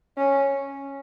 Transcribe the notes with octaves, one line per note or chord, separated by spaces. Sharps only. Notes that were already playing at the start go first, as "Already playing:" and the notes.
C#4